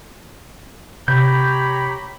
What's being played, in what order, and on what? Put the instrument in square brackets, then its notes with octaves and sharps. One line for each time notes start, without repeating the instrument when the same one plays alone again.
[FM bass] C3 [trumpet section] G4 C#5 A#5 [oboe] B5 [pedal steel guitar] G6